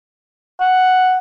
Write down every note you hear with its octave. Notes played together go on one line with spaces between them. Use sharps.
F#5